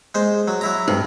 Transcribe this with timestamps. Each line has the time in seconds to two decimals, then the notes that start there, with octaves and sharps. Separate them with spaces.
0.15 G#3 C5
0.48 F#3
0.61 F#3 E4 A#5
0.88 G2